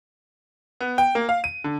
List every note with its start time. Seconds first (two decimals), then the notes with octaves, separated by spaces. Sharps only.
0.81 B3
0.98 G5
1.15 A#3
1.29 F5
1.44 D#7
1.64 D3